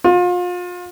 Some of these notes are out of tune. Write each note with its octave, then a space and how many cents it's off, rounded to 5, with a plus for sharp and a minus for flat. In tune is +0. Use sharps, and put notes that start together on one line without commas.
F4 +35